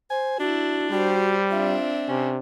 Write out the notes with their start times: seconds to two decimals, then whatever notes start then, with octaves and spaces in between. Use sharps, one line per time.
0.10 C5 G#5
0.40 D4 E4 F#4
0.91 G3 F#4 G4 C5
1.51 C4 D4 F4 E5
2.09 C3 C#4